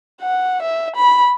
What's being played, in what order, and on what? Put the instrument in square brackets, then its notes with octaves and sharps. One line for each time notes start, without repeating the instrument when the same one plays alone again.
[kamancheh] F#5
E5
B5